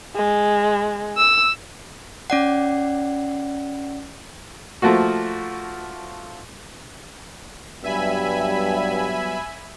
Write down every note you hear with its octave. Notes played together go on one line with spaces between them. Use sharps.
G#3
E6
C#4 D5 F#5
F3 A3 A#3 F#4
G2 F#3 G3 B3 E5 G#5 B5